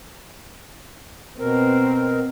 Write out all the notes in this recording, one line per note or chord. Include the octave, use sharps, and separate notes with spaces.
B2 C4 A#4